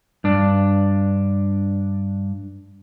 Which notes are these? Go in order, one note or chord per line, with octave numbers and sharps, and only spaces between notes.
G2 D4